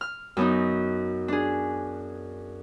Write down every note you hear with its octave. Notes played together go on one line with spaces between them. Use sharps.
F6
F#2 B3 D#4
D4 G#4